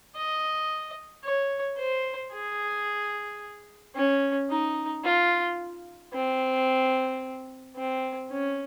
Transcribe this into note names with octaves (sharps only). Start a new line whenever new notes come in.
D#5
C#5
C5
G#4
C#4
D#4
F4
C4
C4
C#4